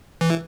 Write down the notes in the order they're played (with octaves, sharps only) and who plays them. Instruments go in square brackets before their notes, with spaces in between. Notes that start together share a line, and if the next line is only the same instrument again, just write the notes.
[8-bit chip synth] E3